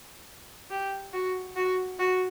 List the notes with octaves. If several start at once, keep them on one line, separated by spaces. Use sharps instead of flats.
G4
F#4
F#4
F#4